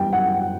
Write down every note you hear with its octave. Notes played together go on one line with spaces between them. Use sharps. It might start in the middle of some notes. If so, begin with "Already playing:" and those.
Already playing: F#2 E3 G3 B3 G5
F#2 F#5